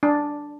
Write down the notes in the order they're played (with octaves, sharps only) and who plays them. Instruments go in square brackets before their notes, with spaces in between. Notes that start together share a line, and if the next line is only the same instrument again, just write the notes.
[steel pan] D4